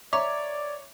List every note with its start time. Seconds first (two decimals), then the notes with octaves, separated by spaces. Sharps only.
0.13 C#5 D5 E5 A#5 D6